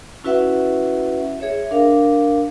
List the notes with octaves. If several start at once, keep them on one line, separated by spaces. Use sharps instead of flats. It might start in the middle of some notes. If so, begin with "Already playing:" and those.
C#4 E4 F#4 B4 E5 F#5
G#4 C#5 E5
D4 A#4 F5